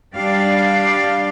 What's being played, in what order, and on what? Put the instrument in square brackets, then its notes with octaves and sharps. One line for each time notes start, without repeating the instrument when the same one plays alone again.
[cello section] G3 D4 G4 D5 F5